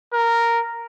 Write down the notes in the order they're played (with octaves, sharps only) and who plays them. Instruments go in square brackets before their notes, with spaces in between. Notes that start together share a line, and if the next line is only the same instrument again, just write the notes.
[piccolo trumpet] A#4